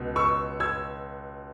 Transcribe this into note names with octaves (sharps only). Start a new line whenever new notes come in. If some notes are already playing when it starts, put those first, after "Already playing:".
Already playing: C#2 B2
C#6 E6
E6 G#6